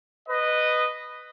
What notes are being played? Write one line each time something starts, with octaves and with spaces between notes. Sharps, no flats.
B4 D#5